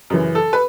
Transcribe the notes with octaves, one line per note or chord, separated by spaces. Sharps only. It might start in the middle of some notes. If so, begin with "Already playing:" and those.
F#2 C#3 E3
A4
B4